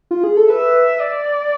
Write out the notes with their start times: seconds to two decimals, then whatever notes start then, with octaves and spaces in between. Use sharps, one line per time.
0.11 F4
0.24 G#4
0.37 A4
0.50 B4 E5
0.99 D5